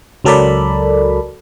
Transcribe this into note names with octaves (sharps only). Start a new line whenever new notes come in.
C#2 F#3 A4 A#4 D5 B5